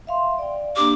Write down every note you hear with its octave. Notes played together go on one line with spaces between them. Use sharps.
E5 F5 C6
D5 G5
A#3 D4 G4 D6